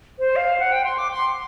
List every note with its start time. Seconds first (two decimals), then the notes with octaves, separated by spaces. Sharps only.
0.19 C5
0.36 F5
0.60 F#5
0.72 G5
0.84 C6
0.98 D6
1.11 C6